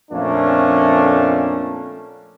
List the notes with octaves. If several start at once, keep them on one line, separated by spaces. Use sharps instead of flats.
F2 A#2 A3 A#3 C#4 D4